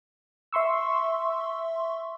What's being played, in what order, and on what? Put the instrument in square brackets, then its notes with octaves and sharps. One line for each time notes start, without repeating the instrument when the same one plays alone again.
[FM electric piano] E5 C6 C#6 E6